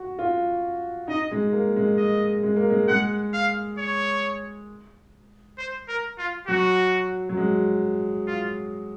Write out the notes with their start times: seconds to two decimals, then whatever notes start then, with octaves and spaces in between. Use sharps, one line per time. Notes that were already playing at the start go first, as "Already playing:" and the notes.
Already playing: F#4
0.19 F4
1.08 D#4 D#5
1.31 G#3
1.53 A#3
1.76 G#3
1.98 D#5
2.43 G#3
2.56 A#3
2.70 G#3
2.88 G#3 F#5
3.33 F5
3.78 C#5
5.58 C5
5.88 A#4
6.18 F4
6.47 F#3 F#4
7.29 F#3
7.37 G#3
8.27 F4